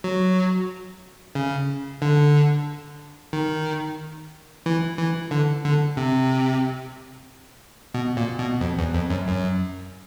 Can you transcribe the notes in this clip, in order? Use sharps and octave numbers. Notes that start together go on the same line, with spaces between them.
F#3
C#3
D3
D#3
E3
E3
D3
D3
C3
B2
A#2
B2
F2
E2
F2
F#2
F#2